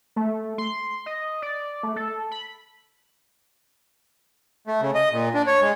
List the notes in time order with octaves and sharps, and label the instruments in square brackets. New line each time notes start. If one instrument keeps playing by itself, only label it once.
[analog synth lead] A3
C6
D#5
D5
A3
A4
B5
[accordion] A3
C#3
D#5
A#2
D4
C#5
G#3